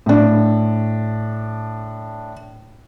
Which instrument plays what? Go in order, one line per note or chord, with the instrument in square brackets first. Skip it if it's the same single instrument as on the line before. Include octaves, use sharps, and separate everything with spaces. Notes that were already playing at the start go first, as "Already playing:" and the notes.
[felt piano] A2 D4